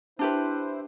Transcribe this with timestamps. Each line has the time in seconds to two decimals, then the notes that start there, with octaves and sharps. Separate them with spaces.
0.19 D4 E4 G4 B4 C5